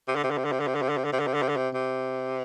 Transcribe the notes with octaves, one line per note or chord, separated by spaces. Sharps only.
C3
D3
C3
D3
C3
D3
C3
D3
C3
D3
C3
D3
C3
D3
C3
D3
C3
D3
C3
D3
C3
C3